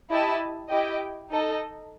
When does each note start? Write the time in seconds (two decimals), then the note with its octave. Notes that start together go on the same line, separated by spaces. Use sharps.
0.10 E4 G4 D#5 A5
0.70 E4 G4 D#5 G5
1.31 D#4 A4 D#5